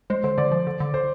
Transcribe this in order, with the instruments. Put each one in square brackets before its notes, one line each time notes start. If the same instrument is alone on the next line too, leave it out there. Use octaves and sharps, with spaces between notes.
[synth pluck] G#3 [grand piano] C5
[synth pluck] D3 [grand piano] C5
[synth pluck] D3 [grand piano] D5
[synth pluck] F3
D3
D3
[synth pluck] D3 [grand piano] C5